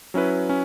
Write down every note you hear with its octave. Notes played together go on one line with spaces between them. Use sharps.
F#3 C#4 E4 B4
C#4